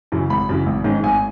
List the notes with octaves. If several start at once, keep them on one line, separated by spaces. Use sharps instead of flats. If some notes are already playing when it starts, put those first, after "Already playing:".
F#2 C#3 E3
G#1 B5
F#2 C#3 E3
G#1
G#2 D#3 G#3 C#4
G#1 G#5